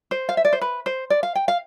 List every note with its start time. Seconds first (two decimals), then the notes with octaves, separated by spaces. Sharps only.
0.11 C5
0.29 F5
0.37 E5
0.45 D5
0.53 C5
0.61 B4
0.86 C5
1.10 D5
1.23 F5
1.35 G5
1.48 F5